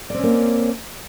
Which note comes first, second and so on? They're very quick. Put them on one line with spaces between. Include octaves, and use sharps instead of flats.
D5 C4 C#4 A#3